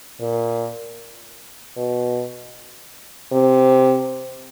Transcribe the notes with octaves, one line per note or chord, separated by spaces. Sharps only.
A#2
B2
C3